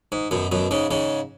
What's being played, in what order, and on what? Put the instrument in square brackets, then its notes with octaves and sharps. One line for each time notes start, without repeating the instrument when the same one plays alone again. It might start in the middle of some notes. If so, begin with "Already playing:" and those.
[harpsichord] G#2
F#2 B2
F#2 B2
G#2 C#3
G#2 C#3